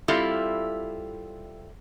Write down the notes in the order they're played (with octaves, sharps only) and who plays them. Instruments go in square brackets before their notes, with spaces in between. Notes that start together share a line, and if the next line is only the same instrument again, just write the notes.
[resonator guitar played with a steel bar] G3 C4 E4 F4 G4 A4